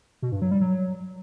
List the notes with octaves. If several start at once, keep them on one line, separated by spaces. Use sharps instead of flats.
B2
G2
F#3
G3
F#3